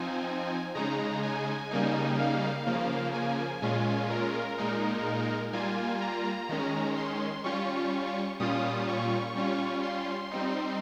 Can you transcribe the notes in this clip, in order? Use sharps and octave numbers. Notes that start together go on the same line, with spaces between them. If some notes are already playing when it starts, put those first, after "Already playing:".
Already playing: F3 C4 D#4 G#5
C#3 G#3 D#4 A#5
G#5
C#3 G3 A#3 D#4
F5
C#3 F3 A#3
G#5
A#2 G#3 C#4 F4
A#4
A#2 G#3 D#4
G3 A#3 F4 G#5
A#5
D#3 G#3 C#4
C6
G3 C#4 F4 C#6
A#2 G3 C#4 F4 D#6
C#6
G3 C#4 F4
C6
G3 C4 D#4